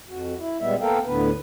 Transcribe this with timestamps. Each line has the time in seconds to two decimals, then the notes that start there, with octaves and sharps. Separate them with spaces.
0.09 F2 F#4
0.38 E4
0.60 A#2 G3 G#3 B3 E5
0.81 A#3 B3 A4 A#4 F5 G5
1.05 D2 A2 D3 B3 B4